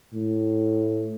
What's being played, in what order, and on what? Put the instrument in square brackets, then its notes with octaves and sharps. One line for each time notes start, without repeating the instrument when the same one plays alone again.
[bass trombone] A2